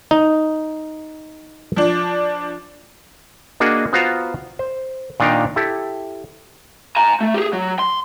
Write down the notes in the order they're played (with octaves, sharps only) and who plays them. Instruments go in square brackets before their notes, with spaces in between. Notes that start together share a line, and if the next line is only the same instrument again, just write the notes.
[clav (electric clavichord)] D#4
[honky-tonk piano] F3 D4
[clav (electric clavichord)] A#3 D4 F#4 G#4 D#5
B3 F4 F#4 C5 F5 A#5
C5
A#2 D#3 D4 D#4 F5 G5
E4 G4 A4
[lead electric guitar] G#5 A#5
A3
G4 G#4
F#3
C6